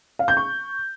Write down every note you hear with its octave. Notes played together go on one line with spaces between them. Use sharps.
F5
G6
C#6